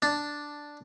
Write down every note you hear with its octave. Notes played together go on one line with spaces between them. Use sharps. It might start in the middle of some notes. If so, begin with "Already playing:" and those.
D4